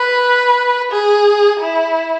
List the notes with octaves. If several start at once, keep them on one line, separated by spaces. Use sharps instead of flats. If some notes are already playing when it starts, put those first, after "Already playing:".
Already playing: B4
G#4
E4